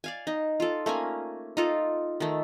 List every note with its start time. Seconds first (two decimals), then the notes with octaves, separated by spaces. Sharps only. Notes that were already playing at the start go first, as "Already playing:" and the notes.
0.04 D5 F5 G#5
0.27 D#4
0.60 F4 A4
0.86 A3 A#3 C#4 G#5
1.57 D#4 F4 A4
2.20 D#3 A3